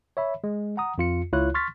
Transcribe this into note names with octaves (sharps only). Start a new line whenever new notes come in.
C#5 E5 B5
G#3
F#5 A#5 D#6
F2 F4 C#7
C#2 E4 F4 C#5 F#6
C6 C#6 F6 A6 B6